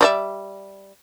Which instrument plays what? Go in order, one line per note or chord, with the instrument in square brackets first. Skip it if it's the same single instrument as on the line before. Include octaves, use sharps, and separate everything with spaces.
[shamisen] G3 D5 E5